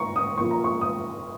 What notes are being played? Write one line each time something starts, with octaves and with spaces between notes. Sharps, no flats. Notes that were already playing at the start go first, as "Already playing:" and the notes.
Already playing: A#2 A#3 A#5 C#6
D#6
A#2 F3 A#3 C#6
A#5
C#6
D#6